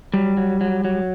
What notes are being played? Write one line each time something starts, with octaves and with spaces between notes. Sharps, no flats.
F#3 G3
F#3
F#3
F#3